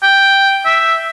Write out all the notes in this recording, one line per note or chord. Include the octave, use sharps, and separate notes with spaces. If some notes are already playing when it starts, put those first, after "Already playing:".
G5
E5